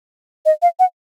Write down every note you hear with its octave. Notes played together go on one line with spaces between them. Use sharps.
D#5
F5
F#5